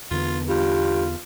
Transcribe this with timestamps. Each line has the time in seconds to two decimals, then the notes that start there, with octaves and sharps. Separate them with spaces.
0.11 E2 D3 B3 F4
0.49 G2 F4 G4